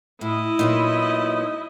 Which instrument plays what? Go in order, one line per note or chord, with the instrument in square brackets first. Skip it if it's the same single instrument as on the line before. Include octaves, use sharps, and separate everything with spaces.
[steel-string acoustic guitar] A2 [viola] E4 D#5
[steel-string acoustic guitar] A#2 F#3 B3 [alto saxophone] D#4